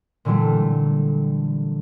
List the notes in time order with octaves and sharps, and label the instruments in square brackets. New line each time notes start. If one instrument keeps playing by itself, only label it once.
[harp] A#2 D3 E3 F#3 G3 A3